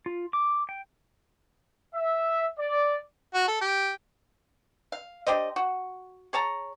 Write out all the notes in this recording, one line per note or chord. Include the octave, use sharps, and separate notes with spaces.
F4
D6
G5
E5
D5
F#4
A4
G4
F5
D4 G4 C5 D#5
F#4
G#4 C#5 A5 A#5